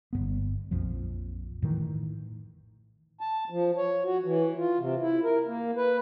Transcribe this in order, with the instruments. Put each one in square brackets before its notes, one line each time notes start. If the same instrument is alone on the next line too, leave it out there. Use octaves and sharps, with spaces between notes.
[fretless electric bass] G1 G2 B3
A#1 F2 F3
A2 D#3 E3
[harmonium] A5
F3
C#5
F#4
E3
F4
C3
E4
A#4
A#3
B4